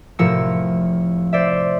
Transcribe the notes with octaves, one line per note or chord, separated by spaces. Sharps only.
F1 A2 F3 A#4 E6 C#7
C5 D5 E5